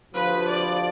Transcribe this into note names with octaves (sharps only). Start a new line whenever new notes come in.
D2 C3 F3 B4
D5